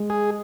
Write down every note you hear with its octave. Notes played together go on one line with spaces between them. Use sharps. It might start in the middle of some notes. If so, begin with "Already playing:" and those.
Already playing: G#3
G#4